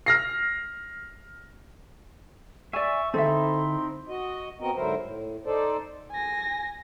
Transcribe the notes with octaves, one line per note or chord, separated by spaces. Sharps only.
F6 A#6 C7
D5 E5 G#5 C#6
D3 C4 D#4 E4 A4 E5 C6
F#4 D#5
B3 C4 F#4 A#4 D#5
G#2 D3 F#3 E4 A#4 C5
A2
D#4 A4 C5 D5
G#5 A#6